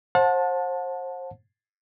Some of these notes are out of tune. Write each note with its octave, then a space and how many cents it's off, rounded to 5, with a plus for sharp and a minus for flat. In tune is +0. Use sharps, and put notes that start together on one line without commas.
C5 +30 F#5 -40 A5 +0